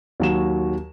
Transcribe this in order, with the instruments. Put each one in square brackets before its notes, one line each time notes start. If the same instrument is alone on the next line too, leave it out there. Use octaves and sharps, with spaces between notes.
[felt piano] D#2 F#3 E7